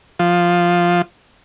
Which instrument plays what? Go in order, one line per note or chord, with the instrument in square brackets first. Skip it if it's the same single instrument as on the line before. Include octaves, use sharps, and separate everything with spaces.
[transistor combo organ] F3